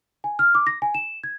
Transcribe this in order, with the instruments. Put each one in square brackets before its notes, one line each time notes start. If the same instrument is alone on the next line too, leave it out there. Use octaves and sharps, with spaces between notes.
[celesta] G#5
F6
D6
A#6
G#5
E7
G#6